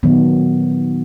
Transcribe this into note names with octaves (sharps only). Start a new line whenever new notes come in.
A#2 D#3 F#3 B3